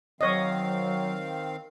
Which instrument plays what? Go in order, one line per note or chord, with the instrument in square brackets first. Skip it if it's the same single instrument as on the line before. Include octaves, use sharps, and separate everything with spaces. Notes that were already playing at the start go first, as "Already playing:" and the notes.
[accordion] D#3 C4 F5 [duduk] F#3 [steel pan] C#5 D#5